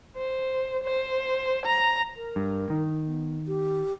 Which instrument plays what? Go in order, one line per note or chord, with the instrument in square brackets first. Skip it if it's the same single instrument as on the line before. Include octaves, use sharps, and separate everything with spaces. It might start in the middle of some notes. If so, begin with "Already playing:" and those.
[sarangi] C5
C5
A#5
[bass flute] A#4
[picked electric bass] G2
D#3
[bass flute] B3
G4